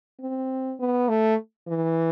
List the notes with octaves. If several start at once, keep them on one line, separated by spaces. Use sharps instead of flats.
C4
B3
A3
E3